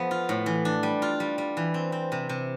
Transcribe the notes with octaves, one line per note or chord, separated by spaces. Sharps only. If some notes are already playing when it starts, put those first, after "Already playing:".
Already playing: F3 B3 A4
F4
A2
E3
D4
G3
F4
G3
G3
E3
C4
C4
C3
C3